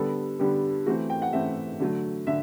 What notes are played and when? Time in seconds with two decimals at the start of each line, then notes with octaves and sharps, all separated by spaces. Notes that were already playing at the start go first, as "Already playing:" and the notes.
Already playing: D3 G3 B3 A4
0.39 D3 G3 B3 G4
0.86 E3 A3 C4 F#4
1.10 G5
1.22 F#5
1.33 E3 A3 C4 E5
1.80 D3 F#3 A3
2.27 D3 E5